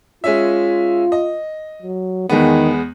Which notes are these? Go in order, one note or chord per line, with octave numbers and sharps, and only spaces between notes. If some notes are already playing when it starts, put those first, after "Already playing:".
G#3 C#4 F4 E5
D#5
F#3
E2 D#3 G#3 B3